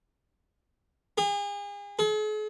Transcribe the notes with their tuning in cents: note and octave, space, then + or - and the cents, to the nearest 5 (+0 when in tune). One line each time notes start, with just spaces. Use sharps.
G#4 -40
G#4 +45